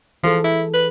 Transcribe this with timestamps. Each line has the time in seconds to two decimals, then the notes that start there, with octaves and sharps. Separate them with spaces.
0.23 E3 F3 G#4 A4
0.44 E4
0.74 B4